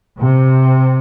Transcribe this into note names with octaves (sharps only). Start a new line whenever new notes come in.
C3